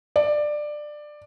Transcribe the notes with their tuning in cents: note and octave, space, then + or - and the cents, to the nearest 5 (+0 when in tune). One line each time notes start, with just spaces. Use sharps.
D5 +15